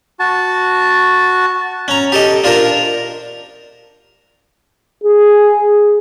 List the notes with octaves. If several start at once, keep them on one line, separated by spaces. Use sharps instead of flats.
F#4 A5
C#4 A#5
G4 A4 D#5
D4 F4 A#4 C5 A#5
G#4